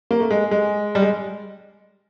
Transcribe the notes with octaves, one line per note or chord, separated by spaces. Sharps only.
A#3
A3
G#3
G#3
G3
G#3